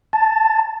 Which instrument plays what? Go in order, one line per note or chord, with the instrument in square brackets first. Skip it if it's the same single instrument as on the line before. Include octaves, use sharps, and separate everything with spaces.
[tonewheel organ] A5